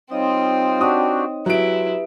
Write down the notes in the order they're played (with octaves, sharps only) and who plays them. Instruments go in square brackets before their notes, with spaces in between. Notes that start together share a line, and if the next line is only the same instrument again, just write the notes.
[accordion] G3 F4 D#6 [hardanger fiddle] C4 [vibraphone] D#4 C#5 D#5
[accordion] D4 F#4 G4 [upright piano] D#6
[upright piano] F#3 D7 [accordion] G#3 [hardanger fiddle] E4 [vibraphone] G4 B4